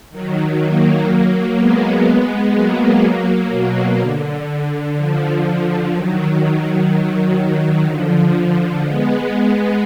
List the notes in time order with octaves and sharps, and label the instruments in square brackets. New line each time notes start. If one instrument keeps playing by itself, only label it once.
[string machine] D#3 F#3
F#3 A#3
G#3 B3
F#3 A#3
B2
D3
D3 F3
D#3 F#3
D#3 F#3
D3 F3
G#3 B3